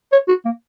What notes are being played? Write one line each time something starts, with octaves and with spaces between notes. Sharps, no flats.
C#5
F#4
A#3